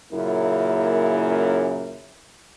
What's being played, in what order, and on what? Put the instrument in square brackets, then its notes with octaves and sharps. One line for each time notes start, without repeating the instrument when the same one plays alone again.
[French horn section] F#2 A#2 C#3 A#3 E4